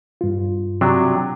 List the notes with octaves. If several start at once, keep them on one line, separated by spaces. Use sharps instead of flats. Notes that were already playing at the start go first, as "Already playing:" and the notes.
G2 F4
C3 F#3 D4